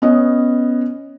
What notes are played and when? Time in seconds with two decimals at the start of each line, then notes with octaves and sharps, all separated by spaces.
0.02 B3 C#4 D#5